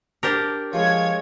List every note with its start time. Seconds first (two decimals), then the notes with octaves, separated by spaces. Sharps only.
0.23 D4 G4 A#4
0.73 F3 G#3 C#5 G#6